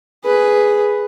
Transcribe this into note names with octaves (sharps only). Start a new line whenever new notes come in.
G#4 B4